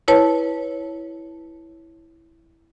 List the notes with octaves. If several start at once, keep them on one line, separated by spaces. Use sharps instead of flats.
E4 B4 C#5 A5